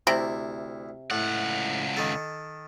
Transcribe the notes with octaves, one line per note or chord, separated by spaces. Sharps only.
D2 C3 E4
C#2 A2 F#5
D#3 A4